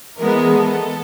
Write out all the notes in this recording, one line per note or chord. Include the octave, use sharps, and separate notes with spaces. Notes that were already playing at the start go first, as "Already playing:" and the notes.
E3 G#3 B3 A#4
A4